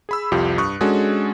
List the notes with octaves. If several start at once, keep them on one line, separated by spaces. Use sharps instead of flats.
G#4 B5 E6
C2 F2 F4 G4
G2 C#6 D#6 F#6
G#3 C#4 D4 F#4 G#4 A4